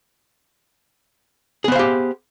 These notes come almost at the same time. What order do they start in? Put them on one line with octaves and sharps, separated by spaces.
G#4 B3 C5 F5 G4